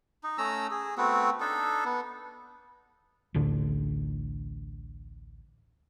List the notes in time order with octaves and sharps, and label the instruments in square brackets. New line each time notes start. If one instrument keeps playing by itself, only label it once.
[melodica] D#4
A3 C#4 A#5 E6
G#4
A3 B3 C4 F#4
D4 D#4 A4
B3
[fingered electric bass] A1 D2 D3